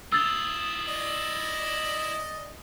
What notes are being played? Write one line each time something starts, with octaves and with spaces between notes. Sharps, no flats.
E4 F4 D#6 E6 A6
D5 D#5